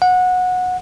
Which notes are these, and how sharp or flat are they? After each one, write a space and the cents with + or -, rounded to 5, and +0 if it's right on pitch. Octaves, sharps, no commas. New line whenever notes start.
F#5 -20